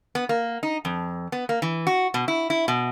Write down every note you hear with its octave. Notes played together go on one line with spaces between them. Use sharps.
B3
A#3
D#4
F2
B3
A#3
E3
F#4
B2
E4
E4
B2